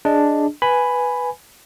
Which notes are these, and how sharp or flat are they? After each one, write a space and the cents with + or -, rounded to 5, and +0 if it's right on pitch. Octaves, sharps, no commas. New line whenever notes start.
D4 +0 G#4 +0 D#5 +0
B4 +0 G#5 +0 B5 +5